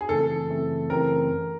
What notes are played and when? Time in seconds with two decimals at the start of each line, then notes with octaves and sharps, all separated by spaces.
0.01 G#4
0.09 F#2 C#3 E3 A3 C4 A4
0.49 F#2 C#3 E3 A3 C4
0.90 F#2 C#3 E3 A3 C4 A#4